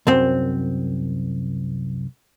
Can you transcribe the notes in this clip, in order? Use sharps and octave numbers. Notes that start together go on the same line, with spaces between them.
C2 F#2 C4